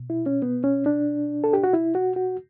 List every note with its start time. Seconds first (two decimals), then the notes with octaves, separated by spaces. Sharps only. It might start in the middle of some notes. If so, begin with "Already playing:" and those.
Already playing: B2
0.10 E4
0.26 C#4
0.42 B3
0.64 C#4
0.86 D4
1.44 A4
1.53 G4
1.64 F#4
1.73 E4
1.95 F#4
2.16 F#4